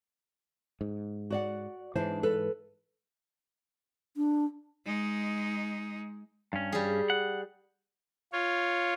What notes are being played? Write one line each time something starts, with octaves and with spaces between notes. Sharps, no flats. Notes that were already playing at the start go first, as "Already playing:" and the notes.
G#2
F#4 D5 F#5
G#2 E3 D4 C5
A4 B4
D4
G#3 D#4
G2 C#4
G3 G#4
F#5
F4 C#5